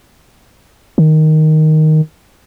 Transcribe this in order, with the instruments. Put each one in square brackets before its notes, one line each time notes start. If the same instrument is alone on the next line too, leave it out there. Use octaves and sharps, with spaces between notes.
[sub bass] D#3